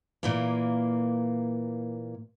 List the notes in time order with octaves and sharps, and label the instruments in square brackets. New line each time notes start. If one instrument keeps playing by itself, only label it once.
[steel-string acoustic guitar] A#2 E3 A#3